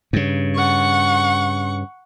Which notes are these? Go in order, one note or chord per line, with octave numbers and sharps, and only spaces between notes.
G2 C#3
F#5 C#6